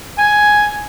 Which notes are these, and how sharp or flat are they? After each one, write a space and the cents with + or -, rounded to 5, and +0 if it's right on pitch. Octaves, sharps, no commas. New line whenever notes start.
G#5 +5